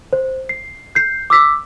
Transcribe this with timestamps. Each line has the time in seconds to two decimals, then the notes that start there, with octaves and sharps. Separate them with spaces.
0.13 C5
0.49 C7
0.95 G6 C7
1.30 D6 E6 B6